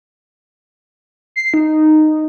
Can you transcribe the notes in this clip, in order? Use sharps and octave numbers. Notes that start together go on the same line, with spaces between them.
C7
D#4